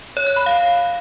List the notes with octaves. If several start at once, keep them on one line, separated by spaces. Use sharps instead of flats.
C#5
F#6
B5
F5